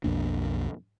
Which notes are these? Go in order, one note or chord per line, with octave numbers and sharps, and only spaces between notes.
B1 F2 A#3 D4